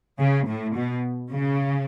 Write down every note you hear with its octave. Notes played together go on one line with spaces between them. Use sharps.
C#3
A2
B2
C#3